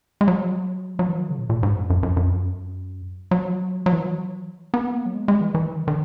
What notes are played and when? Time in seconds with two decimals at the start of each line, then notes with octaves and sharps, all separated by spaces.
0.21 G#3
0.28 F#3
0.99 F#3
1.09 E3
1.19 D#3
1.29 C#3
1.39 A#2
1.50 A#2
1.63 G#2
1.76 F#2
1.90 F#2
2.03 F#2
2.17 F#2
3.31 F#3
3.86 F#3
3.92 E3
4.06 F#3
4.74 B3
4.94 A#3
5.06 F#3
5.14 G#3
5.28 G#3
5.41 E3
5.55 E3
5.75 D#3
5.88 D#3